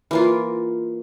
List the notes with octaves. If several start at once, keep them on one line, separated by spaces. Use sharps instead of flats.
E3 A#3 F4